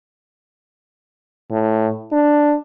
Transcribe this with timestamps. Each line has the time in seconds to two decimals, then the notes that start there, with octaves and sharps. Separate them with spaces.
1.51 A2
2.12 D4